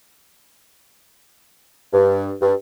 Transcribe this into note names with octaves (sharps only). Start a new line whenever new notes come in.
G2
G2